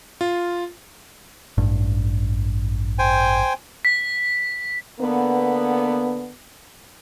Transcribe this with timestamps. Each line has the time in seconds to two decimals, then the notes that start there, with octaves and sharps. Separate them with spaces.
0.21 F4
1.58 A1 G2
2.99 C5 G5 G#5
3.85 B6
5.00 D3 A#3 B3